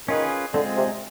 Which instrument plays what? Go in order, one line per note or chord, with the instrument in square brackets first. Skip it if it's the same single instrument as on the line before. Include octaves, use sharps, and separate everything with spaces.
[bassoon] D#3 [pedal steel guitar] C#4 F4 G#4 B4
[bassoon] D3 [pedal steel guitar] G#3 C4 F4 G#4
[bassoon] C3